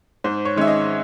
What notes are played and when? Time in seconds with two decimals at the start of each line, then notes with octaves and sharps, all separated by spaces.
0.24 G#2 C5
0.45 C#5
0.56 D#3 G#3 C#4 E5
0.67 D#5